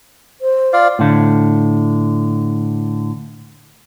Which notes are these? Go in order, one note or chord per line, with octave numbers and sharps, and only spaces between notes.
C5
F4 D5 F5
A2 D3